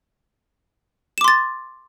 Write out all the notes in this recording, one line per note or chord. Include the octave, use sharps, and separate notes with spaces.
C6 D6 A6 E7